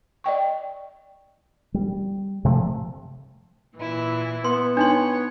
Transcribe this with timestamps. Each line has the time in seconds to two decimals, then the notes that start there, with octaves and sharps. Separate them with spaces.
0.24 D5 D#5 G5 C#6
1.74 G3
2.45 C3 F3 G#3 A3
3.77 A#2 E3 E4
4.44 B3 C6
4.77 D4 D#4 C#5 C6